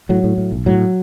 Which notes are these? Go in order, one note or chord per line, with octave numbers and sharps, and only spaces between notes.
A2 F#3
A2
A2
B1
A2 F#3